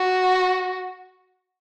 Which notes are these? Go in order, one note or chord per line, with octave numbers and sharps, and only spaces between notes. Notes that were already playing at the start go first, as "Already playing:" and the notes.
Already playing: F#4